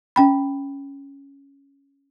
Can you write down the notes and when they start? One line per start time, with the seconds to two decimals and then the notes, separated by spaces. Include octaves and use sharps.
0.16 C#4 G5 B5